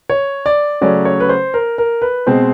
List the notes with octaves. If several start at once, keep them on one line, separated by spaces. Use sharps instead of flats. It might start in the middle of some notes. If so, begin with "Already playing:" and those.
C#5
D5
C#3 F#3 A3 C#4 D5
C#5
B4
C5
A#4
A#4
B4
B2 G#3 C4 C5